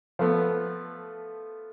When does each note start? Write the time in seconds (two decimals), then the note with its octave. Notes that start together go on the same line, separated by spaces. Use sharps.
0.19 F3 A3 B3